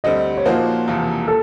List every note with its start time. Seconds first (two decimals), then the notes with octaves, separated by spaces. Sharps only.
0.04 D2 D3 G3 C4 D#5
0.37 C#5
0.46 A#2 F3 A#3 D#4 F#4 C5
0.87 E1 E2 C3 F3 A#3
1.28 A4